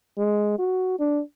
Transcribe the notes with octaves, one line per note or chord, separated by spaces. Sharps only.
G#3
F#4
D4